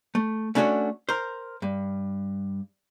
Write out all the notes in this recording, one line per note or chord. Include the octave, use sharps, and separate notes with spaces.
A3
A3 C#4 D4 F#4 B4 C#5
A#4 C5
G2